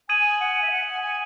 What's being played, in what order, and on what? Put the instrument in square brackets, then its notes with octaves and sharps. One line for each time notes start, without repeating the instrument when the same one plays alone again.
[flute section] G#5 [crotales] D#6 G#6 D#7 F#7
[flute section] F#5
E5
F#5
G#5
G#5